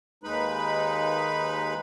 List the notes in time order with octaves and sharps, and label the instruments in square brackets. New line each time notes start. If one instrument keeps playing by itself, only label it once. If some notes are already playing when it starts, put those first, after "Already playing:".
[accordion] D#2 G#3 D#4 B4 B5